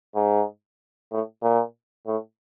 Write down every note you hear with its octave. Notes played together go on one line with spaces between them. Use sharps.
G#2
A2
A#2
A2